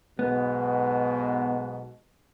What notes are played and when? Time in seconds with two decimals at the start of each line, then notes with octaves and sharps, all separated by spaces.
0.19 B1 G#2 B2 B3